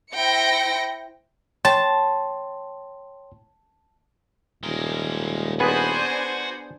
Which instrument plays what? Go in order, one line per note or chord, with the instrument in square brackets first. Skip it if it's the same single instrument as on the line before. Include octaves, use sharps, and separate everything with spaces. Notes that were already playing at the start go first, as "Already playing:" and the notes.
[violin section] E4 C5 G5 A#6 C#7
[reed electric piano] C#5 G5 C6 [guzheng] A5
[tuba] D#1 [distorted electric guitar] G#3 A#4
[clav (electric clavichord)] B3 G#4 B4 [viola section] D4 C5 G#5 [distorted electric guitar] F#4